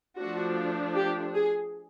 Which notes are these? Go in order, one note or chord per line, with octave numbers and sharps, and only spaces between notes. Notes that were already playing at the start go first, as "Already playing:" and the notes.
F3 A3 D4 F#4
G4
G#4